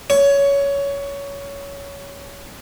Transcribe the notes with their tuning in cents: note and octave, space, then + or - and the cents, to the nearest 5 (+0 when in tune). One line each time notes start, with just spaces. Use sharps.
C#5 +15